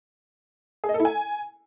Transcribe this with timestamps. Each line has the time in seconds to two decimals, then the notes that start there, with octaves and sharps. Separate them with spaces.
0.84 G#4
0.89 D#5
0.94 A4
1.00 E4
1.05 G#5